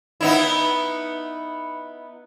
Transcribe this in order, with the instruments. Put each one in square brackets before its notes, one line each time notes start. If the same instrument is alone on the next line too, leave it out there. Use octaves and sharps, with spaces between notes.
[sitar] B3 D#4 E4